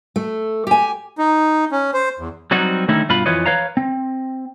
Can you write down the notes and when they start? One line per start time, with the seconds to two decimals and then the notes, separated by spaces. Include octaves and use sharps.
0.16 A3
0.67 G4 G#5
1.18 D#4
1.72 C#4
1.94 C5
2.19 E2
2.51 F#3 G3 C4 D#4 F#4
2.88 D3 D#3 A3 C#4 D#4 E4
3.09 G2 B2 F4 B4 B5
3.26 F2 E3 F4 B4 C#5 D#5
3.46 B4 C#5 F5 A#5
3.77 C4